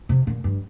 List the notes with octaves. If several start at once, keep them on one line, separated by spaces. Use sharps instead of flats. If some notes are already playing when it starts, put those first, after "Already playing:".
C3
A#2
G2